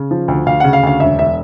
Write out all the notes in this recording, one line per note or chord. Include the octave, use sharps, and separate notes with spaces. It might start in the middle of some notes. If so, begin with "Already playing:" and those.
Already playing: C#3
F3
D2
D2 F5
C#3 F#5
F5
D2 F5
E1 E5
E1 E5